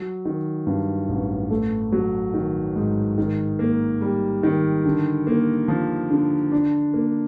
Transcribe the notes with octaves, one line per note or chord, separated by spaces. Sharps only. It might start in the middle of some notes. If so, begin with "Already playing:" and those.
Already playing: F#3
D#3
G2
A1
A3
F#3
D#3
G#2
D#3
A#3
G3
D#3
D3
A#3
F3
D3
D4
A#3